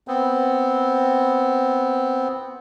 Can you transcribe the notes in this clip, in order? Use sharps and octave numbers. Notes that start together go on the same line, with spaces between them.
B3 C4